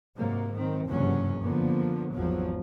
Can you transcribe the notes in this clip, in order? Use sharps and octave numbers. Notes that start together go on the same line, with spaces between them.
G#2 C3 F#3 A#3
D#3 C4
F#1 E2 G2 C3 F#3 C#4
D3 F3 A#3 B3
G#1 E2 F3 F#3